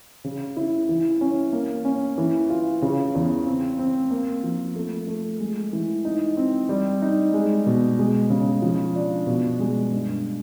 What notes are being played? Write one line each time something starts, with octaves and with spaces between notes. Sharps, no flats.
C#3
E4
E3
C#4
A#3
C#4
E3
F4
C#3
E2
C4
C4
A#3
F3
A3
A3
G#3
E3
D#4
C4
G3
D#4
G#3
B2
G#3
C#3
F3
D4
B2
G#3
G2